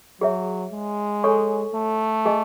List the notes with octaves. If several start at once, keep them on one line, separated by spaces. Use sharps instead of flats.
F#3 G#4 C#5 E5
G#3
A4 C#5 G#5 C#6
A3
G#4 D#5 G#5